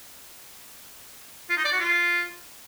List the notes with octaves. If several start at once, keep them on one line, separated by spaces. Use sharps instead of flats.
F4
D#4
D5
F#4
F4